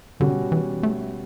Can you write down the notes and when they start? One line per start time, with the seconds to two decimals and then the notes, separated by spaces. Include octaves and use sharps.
0.20 B2 D3 G3 C#4 F#4
0.52 E3
0.83 A3